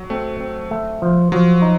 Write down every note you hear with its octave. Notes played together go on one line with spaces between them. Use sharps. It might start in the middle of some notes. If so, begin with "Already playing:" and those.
Already playing: F#3
A3 C4
C4
A3
F3
F3 F#3
D#4